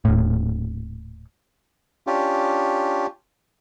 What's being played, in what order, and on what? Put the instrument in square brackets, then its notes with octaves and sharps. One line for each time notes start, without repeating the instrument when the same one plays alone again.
[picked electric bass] D#1 A2
[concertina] C#4 D4 F4 G4